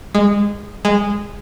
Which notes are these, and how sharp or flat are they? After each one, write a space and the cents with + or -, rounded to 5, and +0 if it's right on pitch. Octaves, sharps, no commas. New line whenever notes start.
G#3 -20
G#3 -15